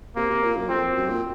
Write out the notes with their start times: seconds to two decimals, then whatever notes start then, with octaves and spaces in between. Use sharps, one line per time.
0.16 C3 A#3
0.30 C3
0.43 A#2
0.56 F#2
0.69 F2 C4
0.96 F#2
1.09 A#2